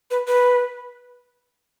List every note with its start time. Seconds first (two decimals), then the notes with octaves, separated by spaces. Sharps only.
0.11 B4
0.28 B4